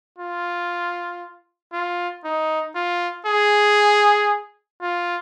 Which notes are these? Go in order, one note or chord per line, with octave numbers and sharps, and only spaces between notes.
F4
F4
D#4
F4
G#4
F4